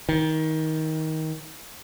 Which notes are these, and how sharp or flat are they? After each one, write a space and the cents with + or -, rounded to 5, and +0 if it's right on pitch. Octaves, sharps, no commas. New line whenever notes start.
D#3 +20